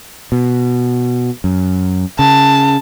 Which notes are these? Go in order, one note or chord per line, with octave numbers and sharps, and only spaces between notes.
B2
F#2
C#3 A5